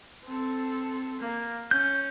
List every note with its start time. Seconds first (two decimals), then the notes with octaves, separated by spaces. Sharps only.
0.25 C4 A4
1.19 A#3
1.71 C#4 G6